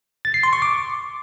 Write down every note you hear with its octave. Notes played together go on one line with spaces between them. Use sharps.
A6
C7
C6
C#6
D6